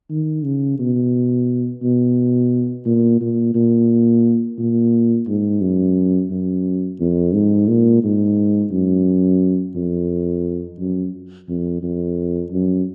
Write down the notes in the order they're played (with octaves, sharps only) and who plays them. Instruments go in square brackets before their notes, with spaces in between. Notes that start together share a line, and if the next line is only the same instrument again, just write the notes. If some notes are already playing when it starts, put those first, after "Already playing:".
[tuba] D#3
C#3
B2
B2
A#2
A#2
A#2
A#2
G#2
F#2
F#2
F2
G#2
A#2
G#2
F#2
F2
F#2
F2
F2
F#2